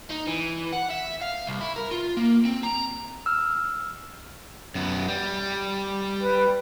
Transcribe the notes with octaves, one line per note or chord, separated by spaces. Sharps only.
D#4
E3
F#5
E5
F5
C2
E4
A#4
F4
A#3
C4
A#5
E6 F6
F#2 B3
G3
B4